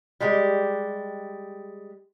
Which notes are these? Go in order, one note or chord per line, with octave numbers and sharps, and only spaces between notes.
G3 G#3 G4